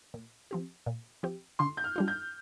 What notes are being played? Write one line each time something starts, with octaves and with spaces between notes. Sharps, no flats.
A#2
F3 C4 G4
A#2
F3 C4 G4
D3 C6
G6
F6
G3 D4 F4
G6